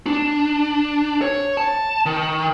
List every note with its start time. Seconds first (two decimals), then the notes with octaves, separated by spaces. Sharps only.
0.06 D4
1.22 C#5
1.57 A5
2.06 D#3